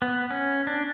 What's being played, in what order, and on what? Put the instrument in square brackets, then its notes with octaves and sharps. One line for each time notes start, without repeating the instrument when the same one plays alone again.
[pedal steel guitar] B3
C#4
D4